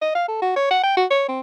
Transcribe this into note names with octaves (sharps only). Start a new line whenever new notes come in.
D#5
F5
A4
F#4
C#5
F#5
G5
F#4
C#5
C4